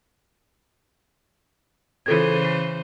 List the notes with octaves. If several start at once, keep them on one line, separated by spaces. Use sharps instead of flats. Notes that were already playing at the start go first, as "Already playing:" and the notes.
C#3 E3 F4 A4 C5 G#6
C7